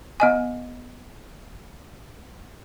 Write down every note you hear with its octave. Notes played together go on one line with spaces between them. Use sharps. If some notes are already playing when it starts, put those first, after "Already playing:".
B3 D#5 G#5